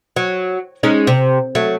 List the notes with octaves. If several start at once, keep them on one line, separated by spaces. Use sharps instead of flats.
F#3
G#3 C#4 D#4
C3
F#3 A3